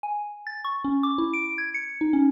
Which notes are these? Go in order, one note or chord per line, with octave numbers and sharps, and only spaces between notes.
G#5
A6
C#6
C#4
D6
E4
D7
G#6
C#7
D#4
C#4